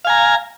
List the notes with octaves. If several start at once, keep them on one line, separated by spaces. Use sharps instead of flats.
F5 G#5 A#5